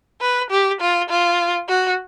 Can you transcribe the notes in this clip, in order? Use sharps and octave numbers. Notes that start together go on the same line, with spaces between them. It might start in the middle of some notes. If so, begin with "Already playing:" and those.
B4
G4
F4
F4
F#4